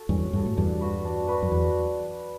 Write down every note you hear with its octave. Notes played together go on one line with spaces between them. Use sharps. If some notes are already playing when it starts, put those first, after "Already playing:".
Already playing: F#4 A4
E2 G2 C#4
G2 F#4 A4
A2
E2 G2 D4
F#4 B4
D4
F#4 B4
F#2
E2 D4